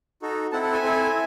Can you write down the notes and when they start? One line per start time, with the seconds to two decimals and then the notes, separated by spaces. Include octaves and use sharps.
0.22 D#4 F#4 A4
0.52 C4 E4 A4 F#5 A5
0.63 F#5 A5
0.73 E5 G#5
0.83 C4 E4 A4